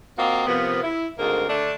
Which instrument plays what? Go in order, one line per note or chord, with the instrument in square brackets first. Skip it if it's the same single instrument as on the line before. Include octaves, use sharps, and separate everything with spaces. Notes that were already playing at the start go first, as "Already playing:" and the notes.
[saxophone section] A#3 C4 F4 F#4 D#5
C3 F3 A#3 B3
E4
D2 G#2 A#3 C4 A#4
D3 A3 D4